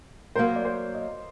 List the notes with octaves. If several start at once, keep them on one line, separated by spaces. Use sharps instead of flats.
F#3 A#3 F#4 A#4 C5
D5
C5
D#5